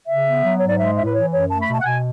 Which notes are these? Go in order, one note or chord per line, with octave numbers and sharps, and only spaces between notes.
C#3 E5
B3
F#3
G#2 C#5
D5
G#3 E5
A2 E5
B4
E3 C#5
F#2 C#5
A3 A5
B5
B2
A5
F#5
B2 G#5